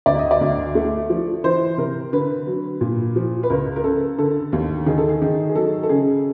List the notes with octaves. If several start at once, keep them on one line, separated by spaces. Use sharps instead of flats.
D2 D5
D#5
D5
D2
A3
F3
E3 C5
C3 A#4
D3 B4
F#3
A#2
F3
B4
C#2 A#4
A#4
C#3 A4
D3 A4
D#2
D#3 G#4
A4
G#4
D#3
G#4
F#3 A4
A4
C#3 G#4